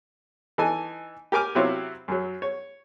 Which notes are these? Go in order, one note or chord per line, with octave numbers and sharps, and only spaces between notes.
E3 D#4 A4 G#5
G4 A#4 G#5 D6 F6
C3 F#3 C4 E4 F4 C#5
F#2 F#3
C#5